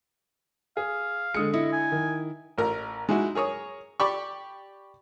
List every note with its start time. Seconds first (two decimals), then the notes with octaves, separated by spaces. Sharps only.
0.77 G#4 F5
1.34 D3 G#3 D#6 C#7
1.53 E4 D#5
1.73 G#5
1.92 D#3
2.58 A1 A#4 A#5
3.09 G#3 D#4 E4 F#4
3.35 G#4 A#4 C#5 D#6
4.00 G4 D5 B5 C#6